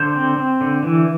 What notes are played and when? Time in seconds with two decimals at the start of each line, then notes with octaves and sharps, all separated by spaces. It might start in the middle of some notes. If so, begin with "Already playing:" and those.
Already playing: D3 C5
0.14 C4
0.37 C4
0.61 D3
0.83 E3